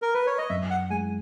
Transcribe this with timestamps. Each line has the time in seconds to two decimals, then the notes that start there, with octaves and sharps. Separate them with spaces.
0.02 A#4
0.14 B4
0.27 C#5
0.38 D#5
0.49 F#2 E5
0.70 F#5
0.90 G#3 G#5